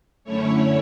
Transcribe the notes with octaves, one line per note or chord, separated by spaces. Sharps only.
F#2 D3 A3 C#4 E4 C#5